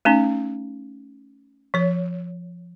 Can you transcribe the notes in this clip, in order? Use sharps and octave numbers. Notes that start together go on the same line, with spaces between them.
A3 C#4 D#4
F3 C#5